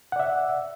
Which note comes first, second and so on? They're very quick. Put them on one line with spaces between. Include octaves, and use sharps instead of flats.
F#5 D5 E5